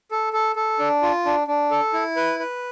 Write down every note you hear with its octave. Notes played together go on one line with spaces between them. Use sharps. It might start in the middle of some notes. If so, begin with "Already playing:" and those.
A4
A4
A4
D4
F4
D4
D4
A4
E4
B4
B4